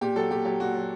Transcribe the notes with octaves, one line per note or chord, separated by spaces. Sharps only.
A#2 G4
F#3 A4
A#2 G4
F#3 G4
A#2 F#4
F#3